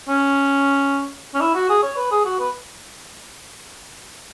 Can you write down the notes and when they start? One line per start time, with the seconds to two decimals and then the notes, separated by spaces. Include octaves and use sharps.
0.09 C#4
1.35 C#4
1.41 E4
1.55 F#4
1.69 G#4
1.83 C#5
1.97 B4
2.11 G#4
2.25 F#4
2.39 B4